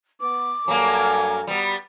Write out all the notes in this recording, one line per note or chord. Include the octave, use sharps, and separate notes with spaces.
B3 D6
G2 F#3 A#3 A4 G#5
G3 B3